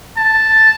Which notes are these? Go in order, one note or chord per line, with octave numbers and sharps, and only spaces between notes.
A5